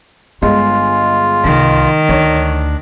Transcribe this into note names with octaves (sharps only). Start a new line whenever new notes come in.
G1 D3 G#3 F4
C2 D#3
D2 D4 C#5